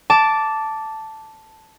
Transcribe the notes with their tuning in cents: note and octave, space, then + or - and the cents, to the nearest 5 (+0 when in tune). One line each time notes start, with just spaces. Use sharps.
A5 +0 D6 -10